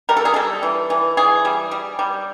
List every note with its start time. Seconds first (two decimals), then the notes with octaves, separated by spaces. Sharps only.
0.09 G3 A#4
0.17 A4
0.25 G#4
0.34 G3 A4
0.63 E3
0.90 E3
1.17 E3 G#4
1.45 G3
1.71 G3
1.99 G3